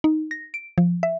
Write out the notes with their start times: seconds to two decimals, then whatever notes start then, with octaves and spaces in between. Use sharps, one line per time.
0.04 D#4
0.31 A#6
0.54 D7
0.78 F3
1.03 E5